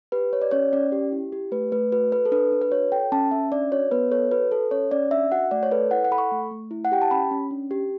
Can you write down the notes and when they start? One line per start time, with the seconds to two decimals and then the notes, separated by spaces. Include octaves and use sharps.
0.12 G4 B4
0.32 G4 C#5
0.42 D5
0.51 C#4 C#5
0.73 C#4 D5
0.92 G4
1.12 E4
1.32 G4
1.52 A3 B4
1.72 A3 B4
1.92 F#4 B4
2.12 A4 B4
2.25 A4
2.32 D4 B4
2.52 D4
2.62 B4
2.72 F#4 C#5
2.92 A4 G5
3.12 C#4 A5
3.31 C#4 E5
3.52 D4 D5
3.72 F#4 C#5
3.91 B3 B4
4.11 A4 C#5
4.31 F#4 B4
4.51 A4
4.71 C#4 C#5
4.91 C#4 D5
5.11 D4 E5
5.32 F#4 F#5
5.51 A3 D5
5.63 C#5
5.71 A4 B4
5.91 E4 F#5
6.04 F#5
6.11 A4 B5
6.18 C#6
6.31 A3
6.51 A3
6.71 E4
6.85 F#5
6.92 G4 G5
7.02 A5
7.11 C#4 B5
7.31 C#4
7.51 D4
7.71 G4